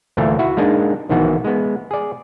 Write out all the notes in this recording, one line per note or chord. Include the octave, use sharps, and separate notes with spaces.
D2 A#2 E3 A3 D4 F5
E4 F#4 E5
G#3 A#3 D4 D#4
A#1 D#3 E3 B3 F#4
G#3 B3
G#4 D5